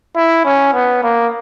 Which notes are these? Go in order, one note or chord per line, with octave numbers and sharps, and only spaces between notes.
E4
C#4
B3
A#3